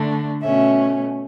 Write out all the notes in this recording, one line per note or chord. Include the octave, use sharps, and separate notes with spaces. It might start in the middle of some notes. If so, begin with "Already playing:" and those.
Already playing: D3 A3 D4
B2 A3 C#4 E5